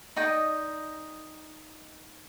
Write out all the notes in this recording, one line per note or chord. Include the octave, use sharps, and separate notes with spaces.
D#4 D5 D#5 G5